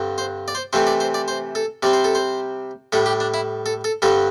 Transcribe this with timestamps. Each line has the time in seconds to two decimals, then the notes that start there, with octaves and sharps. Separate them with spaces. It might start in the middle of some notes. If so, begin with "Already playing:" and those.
Already playing: G2 D3 C4
0.18 C5
0.48 D5
0.55 C5
0.73 C3 E3 A3 C4 C5
0.87 D5
1.00 C5
1.14 D5
1.28 C5
1.55 A4
1.83 C3 G3 C4 D5
1.93 C5
2.04 A4
2.15 C5
2.92 A2 G3 D4 A4
3.06 G4
3.20 D4
3.34 E4
3.66 A4
3.84 A4
4.02 G2 D3 G3 C4 A4